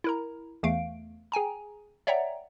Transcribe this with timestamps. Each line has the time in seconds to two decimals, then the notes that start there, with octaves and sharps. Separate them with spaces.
0.04 E4 A#4 A#5
0.63 E2 E3 A3 F5 D7
1.32 G#4 G5 G#5 A#5
2.07 C#5 D5 E5 F#5 G5 A#5